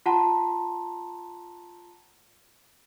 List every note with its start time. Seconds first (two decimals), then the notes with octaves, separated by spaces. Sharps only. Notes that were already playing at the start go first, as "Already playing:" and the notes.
0.06 F4 F#5 A5 A#5 C6